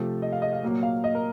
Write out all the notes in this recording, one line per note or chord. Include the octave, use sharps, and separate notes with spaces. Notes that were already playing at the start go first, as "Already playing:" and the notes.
Already playing: C3 F3 A3
D#5
F5
D#5
F5
A#2 F#3 A#3
F5
D#5
A#4